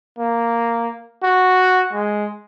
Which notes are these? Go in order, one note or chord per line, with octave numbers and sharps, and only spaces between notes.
A#3
F#4
G#3